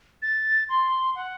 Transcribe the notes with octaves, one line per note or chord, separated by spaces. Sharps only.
A6
C6
F#5